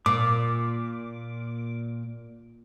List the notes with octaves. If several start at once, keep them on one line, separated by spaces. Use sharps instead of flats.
A#2 D6